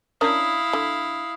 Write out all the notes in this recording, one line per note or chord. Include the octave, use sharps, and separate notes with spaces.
C#4 D4 E4 A#4 F5 D#6
D3